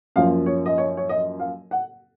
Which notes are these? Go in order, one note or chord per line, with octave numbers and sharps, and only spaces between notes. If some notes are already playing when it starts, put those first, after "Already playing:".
F#2 F3 A#3 F5
C#5
D#5
C#5
C#5
D#5
F5
F#5